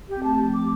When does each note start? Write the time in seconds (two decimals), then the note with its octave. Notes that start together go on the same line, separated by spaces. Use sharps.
0.09 G4
0.16 C4
0.23 A3 A5
0.39 F3
0.54 D6